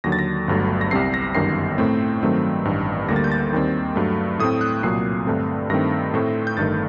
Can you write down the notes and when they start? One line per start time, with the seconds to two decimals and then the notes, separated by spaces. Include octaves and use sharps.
0.04 D#2 D3 F#3 A#6
0.12 A6
0.19 A#6
0.48 G1 G2 F#3 A3
0.81 A#6
0.91 C2 C3 G3 C4 C7
1.14 A#6
1.35 G1 F#2 D#3 G3 C7
1.78 A2 A3 C4
2.22 G2 D#3 F#3 A3 C4
2.65 A1 G2 D#3
3.09 D2 D3 G3 A#3 A#6
3.16 A6
3.24 G6
3.32 A6
3.53 D#2 D#3 G3 C4
3.96 G2 F#3 A3
4.39 A2 A3 C4 D#6
4.61 F#6
4.83 C2 A#2 F#3 C7
5.26 G2 D3 A3 C4
5.70 G2 D#3 A3 C4 A#6
6.14 A2 A3 C4
6.47 G6
6.57 G1 G2 D#3 A3 A6